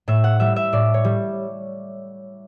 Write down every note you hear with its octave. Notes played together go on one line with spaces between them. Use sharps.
A2 E5
F#5
G3 E5
E5
A2 D5
C#5
G3